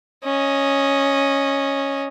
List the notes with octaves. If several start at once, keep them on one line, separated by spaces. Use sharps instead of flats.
C#4 D#5